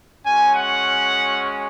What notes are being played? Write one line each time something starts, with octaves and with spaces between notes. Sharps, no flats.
G#3 C#4 F#4 G#5
F#5